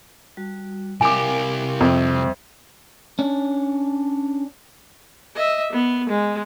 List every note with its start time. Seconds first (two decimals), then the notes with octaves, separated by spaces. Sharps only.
0.37 G3 F#4
1.01 C2 G4 A#4 F5 G#5 D6
1.80 F2 C5 E5
3.19 C#4 D4
5.35 D#5 E5
5.72 B3
6.09 G#3